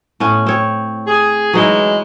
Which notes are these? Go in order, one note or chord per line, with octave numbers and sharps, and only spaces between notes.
A2 B3 C#4
C4 C#5
G#4
E3 F#3 G#3 D#4 E4